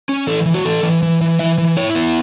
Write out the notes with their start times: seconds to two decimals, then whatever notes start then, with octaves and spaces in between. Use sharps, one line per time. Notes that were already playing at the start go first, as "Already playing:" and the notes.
0.09 C#4
0.27 E3 A4
0.45 E3
0.54 F#4
0.65 E3 A4
0.83 E3
1.02 E3
1.21 E3
1.39 E3 E5
1.58 E3
1.77 E4 C#5
1.95 B3